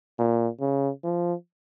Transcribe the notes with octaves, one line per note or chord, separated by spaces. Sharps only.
A#2
C#3
F3